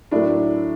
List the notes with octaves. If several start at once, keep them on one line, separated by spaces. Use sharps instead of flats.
A2 F#3 A3 D4 E4